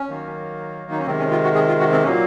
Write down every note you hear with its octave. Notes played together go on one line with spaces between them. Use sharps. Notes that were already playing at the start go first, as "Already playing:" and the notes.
Already playing: C#4
D#3 F#3 A#3
D#4
C#4
C3 D#3 G#3 C4
C#4
F4
F#4
G#4
F4
F#4
C4
A#2 F#3 A#3 C#4